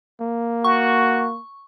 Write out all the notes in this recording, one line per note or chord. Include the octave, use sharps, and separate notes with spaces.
A#3
F#4 C#6